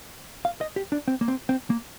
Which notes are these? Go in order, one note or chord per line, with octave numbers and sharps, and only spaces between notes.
F5
D#5
G4
D4
C4
A#3
C4
C4
A#3